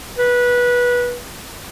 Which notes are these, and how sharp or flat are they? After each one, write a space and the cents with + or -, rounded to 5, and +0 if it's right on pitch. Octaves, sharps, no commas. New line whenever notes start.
B4 -20